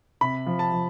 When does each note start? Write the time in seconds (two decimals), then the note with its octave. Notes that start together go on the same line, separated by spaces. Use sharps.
0.21 C3 B5
0.46 F3
0.59 A5
0.72 F3